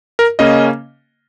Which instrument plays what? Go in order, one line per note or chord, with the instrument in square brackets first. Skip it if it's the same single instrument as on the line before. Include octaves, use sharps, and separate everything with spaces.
[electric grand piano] A#4
C#3 A#3 C#4 D#5